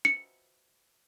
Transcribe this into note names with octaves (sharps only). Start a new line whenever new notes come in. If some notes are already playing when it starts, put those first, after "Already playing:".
C#7